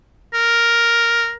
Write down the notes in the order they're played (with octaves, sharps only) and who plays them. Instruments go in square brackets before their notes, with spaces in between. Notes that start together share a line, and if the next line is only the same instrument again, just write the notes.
[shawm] A#4